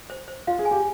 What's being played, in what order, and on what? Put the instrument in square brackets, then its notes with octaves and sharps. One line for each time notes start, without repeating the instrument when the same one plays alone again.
[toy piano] C5
C5
[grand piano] F4 [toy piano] F5
[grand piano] G#4
[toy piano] G#5
[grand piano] G4